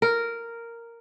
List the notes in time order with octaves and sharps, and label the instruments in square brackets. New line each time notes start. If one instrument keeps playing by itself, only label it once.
[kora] A#4